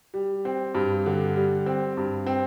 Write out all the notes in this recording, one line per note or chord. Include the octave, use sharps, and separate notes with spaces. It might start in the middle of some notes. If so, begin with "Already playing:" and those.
G3
C4
G2
D3
G3
C4
G2
C4